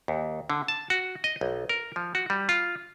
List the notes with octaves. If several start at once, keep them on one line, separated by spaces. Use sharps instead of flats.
D#2
D3
A5
F#4
D#5
B1
A#4
F3
F#4
G3
F4